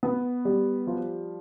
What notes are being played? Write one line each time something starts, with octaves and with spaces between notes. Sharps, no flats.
B3
G3
F3